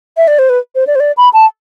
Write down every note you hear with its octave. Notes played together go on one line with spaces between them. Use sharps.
E5
D5
C5
B4
C5
D5
C5
D5
B5
A5